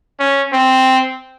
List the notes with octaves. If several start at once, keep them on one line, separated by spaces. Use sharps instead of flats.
C#4
C4